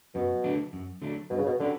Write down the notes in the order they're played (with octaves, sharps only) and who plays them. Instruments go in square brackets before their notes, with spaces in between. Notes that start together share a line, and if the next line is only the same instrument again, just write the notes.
[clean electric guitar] F#2 [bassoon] B2
[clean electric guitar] D3 F#3 A3 D4
F#2
D3 F#3 A3 D4
[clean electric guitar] G2 [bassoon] B2
[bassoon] C#3
B2
[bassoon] D3 [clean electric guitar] F#3 C#4 G4 B4